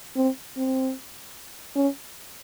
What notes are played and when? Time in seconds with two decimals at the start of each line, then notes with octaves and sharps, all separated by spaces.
0.17 C4
0.57 C4
1.76 C#4